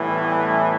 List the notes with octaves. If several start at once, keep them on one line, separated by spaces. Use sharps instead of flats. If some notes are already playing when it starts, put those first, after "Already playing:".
Already playing: A2 E3 G3 B3
C#4